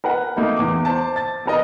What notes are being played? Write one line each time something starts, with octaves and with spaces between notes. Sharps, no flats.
A#4 B4 F#5
A3 A#3 D#4
E2 D6
C5 A5
A6
B3 A#4 D#5